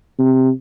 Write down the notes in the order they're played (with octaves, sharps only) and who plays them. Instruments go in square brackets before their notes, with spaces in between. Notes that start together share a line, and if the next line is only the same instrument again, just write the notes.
[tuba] C3